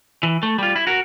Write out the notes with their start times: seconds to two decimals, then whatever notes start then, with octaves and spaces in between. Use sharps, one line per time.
0.23 E3
0.43 A3
0.59 G3 F4
0.76 E4
0.87 F#4 A#4